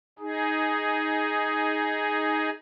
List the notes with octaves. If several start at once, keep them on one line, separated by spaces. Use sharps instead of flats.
D#4 G#4